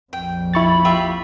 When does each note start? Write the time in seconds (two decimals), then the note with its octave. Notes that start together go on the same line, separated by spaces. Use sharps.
0.13 A#1 F2 G5
0.54 E4 B5 C#6 A6
0.85 F4 G4 E5